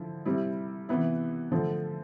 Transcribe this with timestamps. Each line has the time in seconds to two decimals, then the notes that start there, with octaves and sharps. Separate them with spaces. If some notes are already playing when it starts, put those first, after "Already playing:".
Already playing: D3 F3 E4
0.25 C3 G3 C4 E4
0.89 C3 E3 B3 E4
1.52 D3 F3 A3